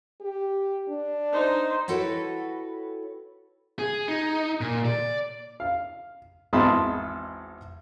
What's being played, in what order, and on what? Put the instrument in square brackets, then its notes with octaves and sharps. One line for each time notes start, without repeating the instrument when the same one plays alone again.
[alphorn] G4
D4
[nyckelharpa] D#4 C5
[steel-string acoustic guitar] E4 F#4 A4 B4 C#5 G5
[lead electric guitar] G#4
D#4
A#2
D5
[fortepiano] F5
G#1 E2 D#5 A5 B5 C6